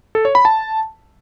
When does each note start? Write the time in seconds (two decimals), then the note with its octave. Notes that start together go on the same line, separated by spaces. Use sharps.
0.15 A4
0.25 C#5
0.35 B5
0.45 A5